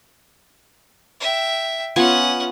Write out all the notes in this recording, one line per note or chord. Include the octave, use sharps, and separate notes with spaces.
E5 G5
B3 C#4 F4 F#5 G#5